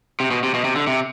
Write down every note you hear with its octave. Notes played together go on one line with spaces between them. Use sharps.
C3
B2
C3
B2
C3
D3
C3